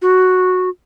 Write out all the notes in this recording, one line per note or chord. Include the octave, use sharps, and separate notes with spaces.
F#4